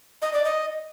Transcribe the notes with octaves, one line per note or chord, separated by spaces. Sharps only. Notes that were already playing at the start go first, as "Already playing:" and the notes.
D#5
D5
D#5